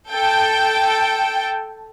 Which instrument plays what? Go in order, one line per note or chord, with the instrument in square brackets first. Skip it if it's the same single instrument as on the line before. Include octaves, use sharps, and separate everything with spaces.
[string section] A4 G5